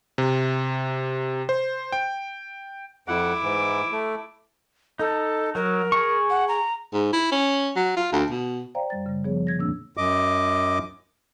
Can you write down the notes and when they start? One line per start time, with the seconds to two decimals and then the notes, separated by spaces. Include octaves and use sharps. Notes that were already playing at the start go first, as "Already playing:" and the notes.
0.18 C3
1.49 C5
1.92 G5
3.08 F2 E4 F#5 D6
3.43 G#2 E3
3.92 A3
4.99 D#4 A4
5.55 F#3 A#4
5.92 G#4 C#6
6.30 F#5
6.48 A#5
6.93 G#2
7.13 E4
7.32 C#4
7.76 F#3
7.97 F4
8.12 D2
8.30 B2
8.75 C5 D5 F5 G5 A#5
8.90 F#2 G3 A6
9.06 C#3 G3
9.24 F3 B3 G#4 C#5
9.47 D3 G#6 A#6
9.59 E2 A#2 A#3 C4 D4 E6
9.97 F#2 D#5 D6